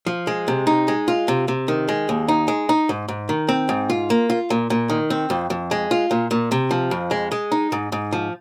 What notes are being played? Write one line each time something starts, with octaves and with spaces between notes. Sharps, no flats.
F3
G#3
C3
D#4
G#3
F4
C3
C3
D#3
G#3
D#2
D#4
G#3
D#4
G#2
G#2
D#3
C4
G#2
F4
A#3
F4
A#2
A#2
D#3
C4
F2
F2
G#3
F4
A#2
A#2
C3
F3
F2
G#3
G#3
D#4
G#2
G#2
F3